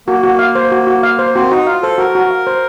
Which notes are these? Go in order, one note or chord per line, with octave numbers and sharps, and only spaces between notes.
A#3 F#4
F#4
F5
C5
F#4
F#4
F5
C5
C4 F#4
D#4 F#4
F4 F5
A4 C5
F#4 A#4
F#4
F5
C5